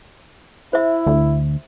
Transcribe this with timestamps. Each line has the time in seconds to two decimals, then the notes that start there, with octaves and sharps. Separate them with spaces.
0.73 E4 C5 E5
1.07 D2